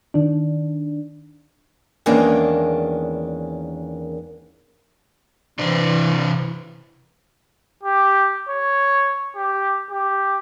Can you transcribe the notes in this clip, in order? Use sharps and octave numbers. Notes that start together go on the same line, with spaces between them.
D#3 D4
E2 D#3 G#3 A#3 C#4 D4
C3 E3 D4 C5
G4
C#5
G4
G4